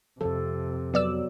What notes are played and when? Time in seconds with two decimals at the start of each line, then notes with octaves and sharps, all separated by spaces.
0.21 F2 C3 F3 A4
0.94 F#3 B3 D5 E6